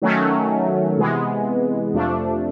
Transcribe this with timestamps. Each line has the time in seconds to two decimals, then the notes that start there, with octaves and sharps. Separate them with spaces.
0.02 D#3 F#3 A3 C#4
0.97 C3 E3 G#3 B3
1.93 F2 C3 F3 A3 D4